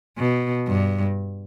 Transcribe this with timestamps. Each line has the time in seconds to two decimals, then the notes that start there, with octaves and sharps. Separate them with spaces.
0.18 B2
0.67 G2